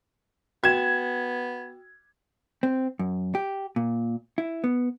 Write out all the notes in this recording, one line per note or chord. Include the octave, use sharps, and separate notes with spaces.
B3 F#4 G5 G#6 E7
C4
F#2
G4
A#2
E4
B3